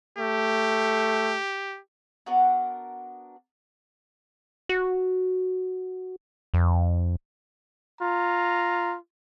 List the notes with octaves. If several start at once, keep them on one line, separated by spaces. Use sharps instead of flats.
A3 G4
B3 D4 F#4 A#4
F#4
F2
F4 A#5